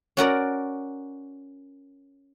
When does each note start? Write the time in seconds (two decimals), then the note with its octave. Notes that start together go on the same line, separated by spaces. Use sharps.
0.17 C#4 F#4 A#4 D5